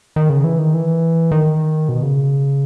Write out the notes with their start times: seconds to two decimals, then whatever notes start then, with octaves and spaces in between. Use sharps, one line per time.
0.16 D#3
0.30 C#3
0.44 E3
0.59 D#3
0.74 E3
1.31 D#3
1.89 B2
2.03 C#3